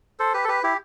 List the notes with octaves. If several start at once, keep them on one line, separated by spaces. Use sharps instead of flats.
A4 C5
G4 B4
A4
G4 B4
E4 G4